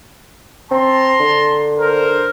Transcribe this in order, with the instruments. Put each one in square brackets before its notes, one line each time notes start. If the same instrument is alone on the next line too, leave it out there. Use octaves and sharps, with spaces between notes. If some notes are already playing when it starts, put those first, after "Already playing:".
[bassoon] C4 [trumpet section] A5 A#5 C6
[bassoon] D3
[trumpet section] A#4 C5